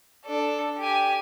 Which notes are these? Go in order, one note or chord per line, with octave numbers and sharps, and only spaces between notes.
D4 A4
G4 G#5